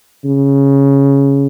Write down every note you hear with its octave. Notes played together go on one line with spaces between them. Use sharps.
C#3